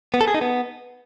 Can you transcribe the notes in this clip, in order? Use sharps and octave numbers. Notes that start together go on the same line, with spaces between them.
B3
A4
G#4
D#4
B3